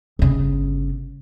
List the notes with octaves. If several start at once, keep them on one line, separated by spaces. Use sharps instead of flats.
G1 C#3